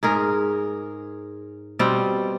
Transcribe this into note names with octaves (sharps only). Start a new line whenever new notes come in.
G#2 G#4 A#4
B2 G3 C4